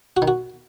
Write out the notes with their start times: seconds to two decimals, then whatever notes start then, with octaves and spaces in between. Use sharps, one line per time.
0.17 F#4
0.22 D#3
0.28 F#4